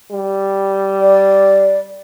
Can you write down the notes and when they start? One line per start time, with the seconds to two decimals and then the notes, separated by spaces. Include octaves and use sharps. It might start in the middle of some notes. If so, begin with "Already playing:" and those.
0.13 G3
1.01 D5